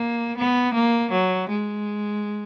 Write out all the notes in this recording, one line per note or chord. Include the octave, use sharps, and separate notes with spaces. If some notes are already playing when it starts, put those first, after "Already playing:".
Already playing: A#3
B3
A#3
F#3
G#3